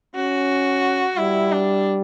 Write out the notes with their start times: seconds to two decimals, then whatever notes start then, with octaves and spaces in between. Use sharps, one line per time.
0.16 C#4 F#4
1.17 G3 E4
1.52 D4